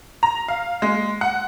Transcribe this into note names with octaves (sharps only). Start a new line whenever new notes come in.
A#5
F5
G#3
F#5